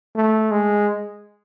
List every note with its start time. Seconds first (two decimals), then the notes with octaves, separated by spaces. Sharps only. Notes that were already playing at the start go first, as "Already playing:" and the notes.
0.16 A3
0.51 G#3